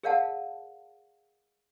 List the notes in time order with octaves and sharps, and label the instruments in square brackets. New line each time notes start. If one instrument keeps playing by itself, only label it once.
[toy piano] G#4 A#4 D5 F5 F#5 A5